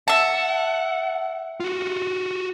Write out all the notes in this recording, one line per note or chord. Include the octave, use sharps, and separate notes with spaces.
E5 F#5 A5
F4 F#4